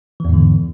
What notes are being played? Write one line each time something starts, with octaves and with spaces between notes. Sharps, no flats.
E2 G#2 D3 E3